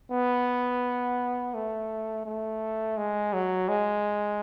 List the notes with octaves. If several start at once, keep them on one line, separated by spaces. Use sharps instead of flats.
B3
A3
A3
G#3
F#3
G#3